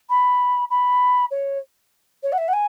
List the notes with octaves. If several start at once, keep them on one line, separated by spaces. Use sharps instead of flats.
B5
B5
C#5
C#5
F#5
E5
F#5
G#5